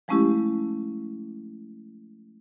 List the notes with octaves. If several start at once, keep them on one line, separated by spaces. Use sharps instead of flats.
F3 G#3 A3 C#4 E4 G4